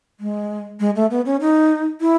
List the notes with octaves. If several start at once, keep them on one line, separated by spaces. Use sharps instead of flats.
G#3
G#3
A3
B3
C#4
D#4
E4